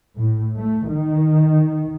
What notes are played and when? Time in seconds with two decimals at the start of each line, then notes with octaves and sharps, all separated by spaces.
0.15 A2
0.56 A3
0.88 D#3